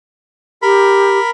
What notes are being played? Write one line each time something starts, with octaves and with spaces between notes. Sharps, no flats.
G4 A#4 B5